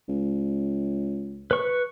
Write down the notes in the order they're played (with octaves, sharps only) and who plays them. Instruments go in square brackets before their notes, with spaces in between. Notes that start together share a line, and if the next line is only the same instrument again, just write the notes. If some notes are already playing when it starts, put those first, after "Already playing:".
[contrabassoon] C#2
[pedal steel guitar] B4 C#6